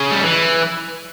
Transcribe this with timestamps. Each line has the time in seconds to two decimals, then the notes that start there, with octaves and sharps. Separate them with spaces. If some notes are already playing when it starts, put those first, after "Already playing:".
Already playing: C#3
0.11 G3
0.23 E3